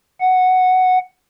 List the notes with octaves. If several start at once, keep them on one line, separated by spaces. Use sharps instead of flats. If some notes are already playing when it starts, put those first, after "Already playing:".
F#5